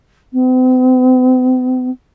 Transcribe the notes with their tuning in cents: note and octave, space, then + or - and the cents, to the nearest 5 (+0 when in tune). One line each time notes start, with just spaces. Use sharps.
C4 -45